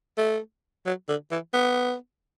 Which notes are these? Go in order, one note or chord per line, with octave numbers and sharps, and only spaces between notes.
A3
F#3
D3
E3
B3